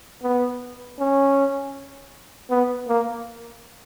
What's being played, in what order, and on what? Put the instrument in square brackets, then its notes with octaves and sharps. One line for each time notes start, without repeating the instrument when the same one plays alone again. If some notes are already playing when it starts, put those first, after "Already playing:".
[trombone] B3
C#4
B3
A#3